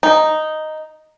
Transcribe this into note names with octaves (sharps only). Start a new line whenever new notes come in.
D#4